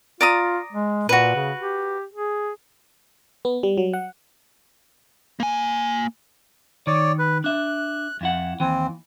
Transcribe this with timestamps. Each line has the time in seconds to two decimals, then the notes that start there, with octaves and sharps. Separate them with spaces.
0.21 F4 D5 A#5 D#6
0.72 G#3
1.09 A#2 F#4 B4
1.35 C#3
1.59 G4
2.14 G#4
3.45 B3
3.63 G3
3.78 F#3
3.93 F#5
5.40 A#3 G#5
6.87 D#3 C#5 D5
7.19 B4
7.44 D4 E5 F#6
8.21 F2 E4 F#5
8.60 D#2 E3 C4